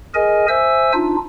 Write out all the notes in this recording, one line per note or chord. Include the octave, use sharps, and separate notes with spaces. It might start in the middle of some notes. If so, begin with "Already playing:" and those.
G#4 A#4 D#5 G#5
C5 E5 G#5 E6
D4 D#4 F4